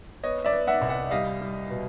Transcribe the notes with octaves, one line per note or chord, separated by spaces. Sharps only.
B3 C#5 D#5
D5 E5
B3
E5 F#5
C2
E5 F#5
G3 D#5 F5
G3
B2